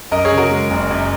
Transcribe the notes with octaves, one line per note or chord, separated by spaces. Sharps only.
F#2 A#4 D#5
G#4 C#5
C#3
F#4 A#4
G#3
F#1
F#2